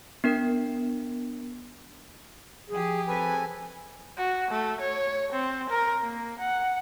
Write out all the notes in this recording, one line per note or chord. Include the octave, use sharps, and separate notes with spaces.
B3 D4 A#4
F3 G4 G#4
C4 A4 B4 G#5
F#4
A3
C#5
C4
A#4
A#3
F#5